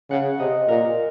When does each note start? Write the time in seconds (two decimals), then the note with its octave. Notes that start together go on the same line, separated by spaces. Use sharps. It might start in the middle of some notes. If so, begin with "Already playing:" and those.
0.10 C#3 F#5
0.39 C3 D#5
0.68 A#2 A#4